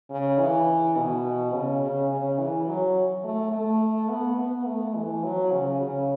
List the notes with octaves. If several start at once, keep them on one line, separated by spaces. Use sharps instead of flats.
C#3
E3
B2
C#3
C#3
C#3
E3
F#3
A3
A3
B3
B3
A3
E3
F#3
C#3
C#3